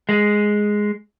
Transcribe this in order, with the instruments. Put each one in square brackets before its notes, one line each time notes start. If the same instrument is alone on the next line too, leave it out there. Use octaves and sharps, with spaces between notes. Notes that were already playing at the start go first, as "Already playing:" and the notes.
[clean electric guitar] G#3